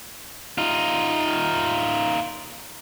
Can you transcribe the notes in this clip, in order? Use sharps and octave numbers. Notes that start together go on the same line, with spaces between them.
D#4 F4